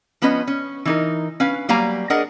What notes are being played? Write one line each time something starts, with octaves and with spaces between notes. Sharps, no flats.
F3 B3 C#4 B4 D#5
C#4
E3 D#4 A#4
C#4 B4 F5
F#3 G3 A#3 F5 G#5 A#5
D4 G#4 A#4 D#5 F#5